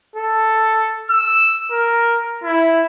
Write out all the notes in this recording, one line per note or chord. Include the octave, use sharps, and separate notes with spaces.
A4
E6
A#4
E4